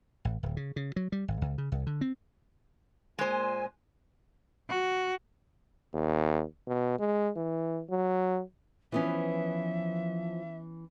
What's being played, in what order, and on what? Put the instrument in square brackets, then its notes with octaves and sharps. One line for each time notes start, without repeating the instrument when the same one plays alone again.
[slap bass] A1
D1
C#3
C#3
F#3
G3
G#1
C#2
C#3
C2
D3
C4
[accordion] A#2 G#5 [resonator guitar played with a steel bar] G#3 C5
[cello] F#4
[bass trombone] D#2
B2
G#3
E3
F#3
[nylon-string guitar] E3 B3 C#4 [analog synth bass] F3 [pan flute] E5